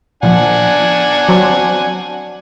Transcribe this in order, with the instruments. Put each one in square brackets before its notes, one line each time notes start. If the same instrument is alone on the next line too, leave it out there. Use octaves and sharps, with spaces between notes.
[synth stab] A#2 F3 [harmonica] D4 F#5 G#5
[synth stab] F#3 C4